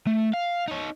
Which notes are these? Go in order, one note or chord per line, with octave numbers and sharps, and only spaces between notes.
A3
F5
D#4 C#5